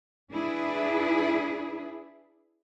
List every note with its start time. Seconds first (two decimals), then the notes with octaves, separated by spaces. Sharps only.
0.31 D4 E4 G#4 B4